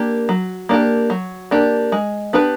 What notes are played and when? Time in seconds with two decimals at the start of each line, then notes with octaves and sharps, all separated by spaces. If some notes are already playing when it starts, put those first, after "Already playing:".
Already playing: A#3 D4 G4
0.29 F#3
0.69 A#3 D4 G4
1.10 F#3
1.51 A#3 D4 G4
1.92 G#3
2.33 B3 D4 G4 B4